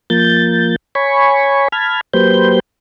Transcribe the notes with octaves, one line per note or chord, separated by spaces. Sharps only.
F3 A#3 G6 A6
C#5 G#5 B5 C#6
A5 B5 F6 G#6
F#3 A#3 G4 B4 C5 G6